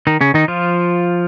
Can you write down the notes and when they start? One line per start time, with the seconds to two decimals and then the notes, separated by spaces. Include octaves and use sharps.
0.07 D#3 D#4
0.21 C#3 C#4
0.34 D#3 D#4
0.48 F3 F4